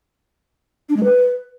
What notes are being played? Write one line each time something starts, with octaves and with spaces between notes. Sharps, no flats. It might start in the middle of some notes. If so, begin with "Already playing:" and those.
D4
G#3
B4